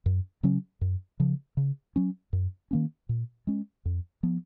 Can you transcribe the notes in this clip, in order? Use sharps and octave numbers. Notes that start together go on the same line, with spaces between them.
F#2
C#3 F#3 C#4
F#2
C#3 F3
C#3
F#3 C#4
F#2
D#3 A#3 C#4
A#2
G#3 C#4
F2
F3 B3